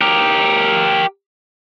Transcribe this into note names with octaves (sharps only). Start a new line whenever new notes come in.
G4 A#4